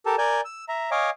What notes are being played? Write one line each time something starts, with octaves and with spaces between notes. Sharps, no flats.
G4 A4 A#4 A5
A#4 D5 G#5 G6
E6
E5 A#5
C#5 D#5 F5 G#5 D6